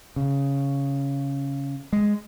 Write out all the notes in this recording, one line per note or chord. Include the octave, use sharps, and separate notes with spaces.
C#3
G#3